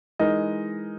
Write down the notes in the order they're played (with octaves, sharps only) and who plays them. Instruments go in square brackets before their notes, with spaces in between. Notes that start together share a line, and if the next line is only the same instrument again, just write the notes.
[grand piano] E3 G#3 D#4 A#4 D#5